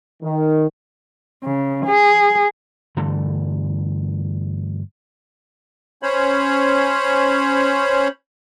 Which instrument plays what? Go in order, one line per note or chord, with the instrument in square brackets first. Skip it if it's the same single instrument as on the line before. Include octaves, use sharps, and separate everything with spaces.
[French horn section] D#3
[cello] C#3
G#4
[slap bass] G2 D3 E3 A3
[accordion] C#4 C5 C#5 B5